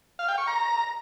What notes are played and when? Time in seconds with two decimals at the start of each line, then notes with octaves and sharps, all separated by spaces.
0.19 F5
0.28 G5
0.38 C#6
0.47 A#5